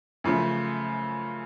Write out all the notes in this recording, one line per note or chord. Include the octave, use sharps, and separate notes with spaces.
F#2 C#3 F3 A3